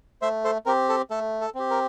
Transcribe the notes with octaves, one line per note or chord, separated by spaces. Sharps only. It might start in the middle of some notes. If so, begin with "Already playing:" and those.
A3 C5 E5
A4 C5
C4 G4 A#4
A4
A3 A4
A4
C4 G4
A#4